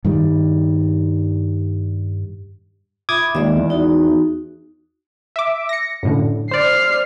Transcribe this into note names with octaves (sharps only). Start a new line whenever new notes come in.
G2 D#3 G3
F4 E5 B5 D6 D#6 G#6
D#2 G#3 D5 E5
E2
D#4 F#4
E5 D6
A#6 C#7
F#2 A2 D3
C5 D5 F6 C7